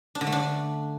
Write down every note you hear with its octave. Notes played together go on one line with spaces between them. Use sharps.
D4
D3
A3
D4